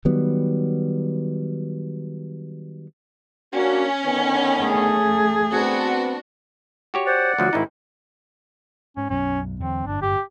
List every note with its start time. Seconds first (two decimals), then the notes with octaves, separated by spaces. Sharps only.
0.05 D#3 F#3 G3 B3
3.53 A#3 C#4 D4 F#4
4.05 D3 D#3 B3
4.61 A3 G#4
5.52 B3 C4 D4 F#4
6.94 F#4 G4 C#5
7.06 C5 D5 F#5
7.38 D2 F3 F#3 F#4
7.53 G#1 D#4 E4
8.97 G#2 C#4
9.10 B1 F#2 C#4
9.60 E2 D3 F#3 C4
9.87 G1 F#2 A2 D4
10.02 G4